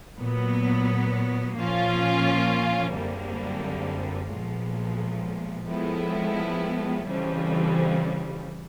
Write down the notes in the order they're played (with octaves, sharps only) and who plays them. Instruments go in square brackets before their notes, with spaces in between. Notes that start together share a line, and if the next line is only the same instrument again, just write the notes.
[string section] A#2 F#3 B3
A#2 F3 A#3 C#4 F4
G#1 F#2 D3 G3 A#3
B1 A#2 F3 G#3
A2 F3 G#3 B3 E4
F2 C#3 E3 G3